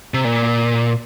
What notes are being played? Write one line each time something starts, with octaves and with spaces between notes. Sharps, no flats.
C3
A#2